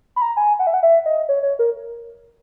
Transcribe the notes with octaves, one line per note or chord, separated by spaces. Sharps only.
B5
A#5
G#5
F#5
E5
F#5
E5
D#5
C#5
C#5
A#4